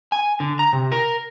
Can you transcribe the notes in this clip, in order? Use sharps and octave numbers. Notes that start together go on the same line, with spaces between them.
G#5
D3
A#5
C3
A#4